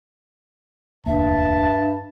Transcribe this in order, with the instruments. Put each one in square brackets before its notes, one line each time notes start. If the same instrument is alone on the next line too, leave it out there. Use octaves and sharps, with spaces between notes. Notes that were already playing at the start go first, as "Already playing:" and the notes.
[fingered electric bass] E1 D2 A#3 [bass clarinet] G2 [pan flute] E5 [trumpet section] A5